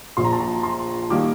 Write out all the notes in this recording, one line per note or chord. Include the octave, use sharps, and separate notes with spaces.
A#1 A#2 F3 C6
A#5
A5
A#5
C6
D#3 G3 A#3 D6